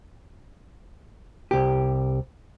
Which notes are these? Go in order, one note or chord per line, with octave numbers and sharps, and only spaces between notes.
C2 G4